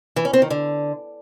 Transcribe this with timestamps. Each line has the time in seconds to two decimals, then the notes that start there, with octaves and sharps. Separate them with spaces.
0.16 E3
0.25 C#4
0.33 C4
0.42 D#3
0.50 D3